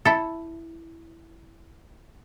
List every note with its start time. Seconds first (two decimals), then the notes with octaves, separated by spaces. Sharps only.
0.05 E4 A4